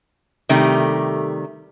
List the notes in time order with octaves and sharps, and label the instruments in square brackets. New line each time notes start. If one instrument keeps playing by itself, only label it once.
[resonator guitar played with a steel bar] C3 D#3 G3 A3